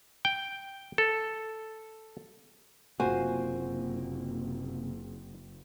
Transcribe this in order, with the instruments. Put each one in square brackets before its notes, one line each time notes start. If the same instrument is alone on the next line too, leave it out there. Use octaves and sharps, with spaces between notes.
[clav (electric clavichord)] G5
A4
[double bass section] F#1 [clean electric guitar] C3 A#3 [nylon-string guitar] F4 C5 G#5 [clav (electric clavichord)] F#4